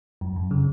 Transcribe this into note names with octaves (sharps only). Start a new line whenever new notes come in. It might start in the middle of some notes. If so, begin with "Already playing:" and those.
F#2
F#2
C#3